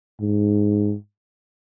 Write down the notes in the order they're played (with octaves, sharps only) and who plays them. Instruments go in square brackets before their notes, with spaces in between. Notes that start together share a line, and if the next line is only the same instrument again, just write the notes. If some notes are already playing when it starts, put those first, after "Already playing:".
[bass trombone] G#2